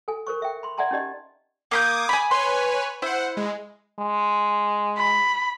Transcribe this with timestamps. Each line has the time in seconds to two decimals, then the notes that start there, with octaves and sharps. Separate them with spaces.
0.08 A4 G#5
0.27 A#4 C5 C#6
0.42 E5 G5
0.63 B5 C6
0.78 D5 E5 F#5 G#5 A#5 C6
0.91 C#4 D#4 G4 D5 D#5
1.71 A#3 B5 D6 D#6 G6 G#6
2.09 G#5 B5
2.31 B4 C#5 G#5 C6
3.02 E4 C5 F#5
3.37 G#3
4.00 G#3
4.97 B5